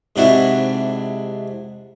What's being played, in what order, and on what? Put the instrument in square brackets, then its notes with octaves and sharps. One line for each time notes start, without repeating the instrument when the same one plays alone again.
[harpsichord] G#2 C3 D4 E4 F#4